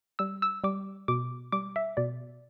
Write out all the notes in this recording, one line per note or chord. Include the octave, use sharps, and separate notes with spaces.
G3 E6
E6
G3 D6
B2 D6
G3 D6
E5
B2 D5